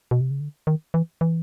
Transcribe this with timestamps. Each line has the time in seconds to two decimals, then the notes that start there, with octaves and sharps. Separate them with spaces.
0.11 B2
0.21 C3
0.31 C#3
0.40 D3
0.67 D#3
0.94 E3
1.21 E3